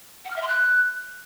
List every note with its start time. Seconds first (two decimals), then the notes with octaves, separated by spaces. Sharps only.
0.24 F#5
0.30 F6
0.36 E5
0.42 C6
0.47 F#6